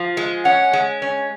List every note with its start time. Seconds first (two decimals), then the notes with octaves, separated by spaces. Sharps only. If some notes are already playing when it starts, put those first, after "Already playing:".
Already playing: F3
0.17 G#3
0.45 C#4 F#5
0.73 G#3
1.02 C#4